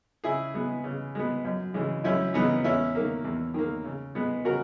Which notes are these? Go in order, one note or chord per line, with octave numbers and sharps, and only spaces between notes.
C#3 E4 G#4
G#3 B3
C#3
G#3 B3
F#2
C#3 E3 G#3
F#2 C#4 E4
C#3 E3 G#3 B3 D#4
E2 C#4 E4
D#3 A#3
E2
D#3 A#3
C#3
G#3 B3
C#3 F#4 A#4